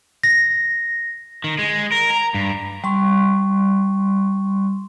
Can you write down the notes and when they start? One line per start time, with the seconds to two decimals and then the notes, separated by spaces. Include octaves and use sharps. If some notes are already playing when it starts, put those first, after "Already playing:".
0.23 A#6
1.44 D#3
1.59 G#3
1.92 A#4
2.10 A#5
2.34 G2
2.84 G3 C6 C#6